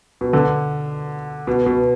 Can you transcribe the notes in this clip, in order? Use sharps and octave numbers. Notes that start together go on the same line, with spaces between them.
B2
D3
B2
B2